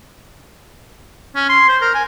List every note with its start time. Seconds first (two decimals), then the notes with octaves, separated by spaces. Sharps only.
1.35 C#4
1.49 C6
1.68 C5
1.81 A#4
1.94 G#5